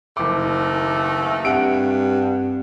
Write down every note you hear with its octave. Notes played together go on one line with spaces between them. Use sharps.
F#1 D#2 E3 A3 D6
G2 C4 F#5 D7